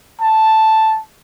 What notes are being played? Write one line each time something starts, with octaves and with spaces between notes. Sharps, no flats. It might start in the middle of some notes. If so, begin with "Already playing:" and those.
A5